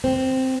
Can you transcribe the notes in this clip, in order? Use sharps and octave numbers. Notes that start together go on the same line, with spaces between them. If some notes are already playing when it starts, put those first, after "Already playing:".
C4